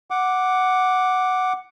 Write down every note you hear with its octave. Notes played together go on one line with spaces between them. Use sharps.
F#5 D6